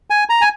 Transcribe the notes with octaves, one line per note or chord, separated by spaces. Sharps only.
G#5
A#5
G#5